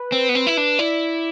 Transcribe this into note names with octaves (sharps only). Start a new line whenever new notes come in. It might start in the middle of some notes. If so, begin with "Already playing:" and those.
Already playing: B4
C4
B3
C4
E4
D4
E4 D5